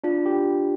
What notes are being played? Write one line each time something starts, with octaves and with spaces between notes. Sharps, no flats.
D4 F4
G4